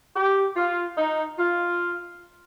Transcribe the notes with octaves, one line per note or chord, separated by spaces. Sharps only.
G4
F4
D#4
F4